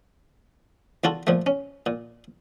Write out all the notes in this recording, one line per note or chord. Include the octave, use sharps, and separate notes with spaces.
E2 F4 F#4 A4
A#2 F3 A3
C#4
A#2